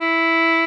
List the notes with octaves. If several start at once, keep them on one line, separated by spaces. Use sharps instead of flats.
E4